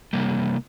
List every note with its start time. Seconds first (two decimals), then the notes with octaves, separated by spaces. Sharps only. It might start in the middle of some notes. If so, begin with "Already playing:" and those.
0.13 C3 G3 A#3